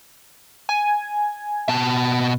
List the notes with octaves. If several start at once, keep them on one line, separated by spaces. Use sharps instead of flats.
G#5
B2 A5